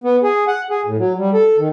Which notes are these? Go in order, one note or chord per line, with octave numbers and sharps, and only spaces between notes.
B3
G#4
F#5
G#4
A2
F#3
G3
A4
D#3